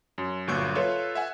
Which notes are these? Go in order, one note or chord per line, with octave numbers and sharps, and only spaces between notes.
F#2
G1 A#2 F#3 C#6 F#6 G6
F4 A4 B4 C#5 E5
E5 F#5 G#5